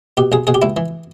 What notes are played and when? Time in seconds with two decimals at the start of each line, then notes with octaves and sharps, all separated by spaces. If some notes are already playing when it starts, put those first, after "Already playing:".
0.17 B2 G4
0.32 B1 G#4
0.47 B2 G#4
0.54 G4
0.62 C#2 E4
0.77 E3